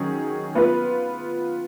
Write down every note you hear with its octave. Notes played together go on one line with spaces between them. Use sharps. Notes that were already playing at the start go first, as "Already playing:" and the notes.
Already playing: D#3 F#3 C#4 G#4
B3 F4 B4